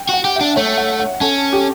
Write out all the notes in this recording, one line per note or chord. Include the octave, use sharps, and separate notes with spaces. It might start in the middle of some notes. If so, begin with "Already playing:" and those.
Already playing: G5
F#4 F#5
G4
D4 E5
A3 C#5
F#5
F#5
C#4 A4
G4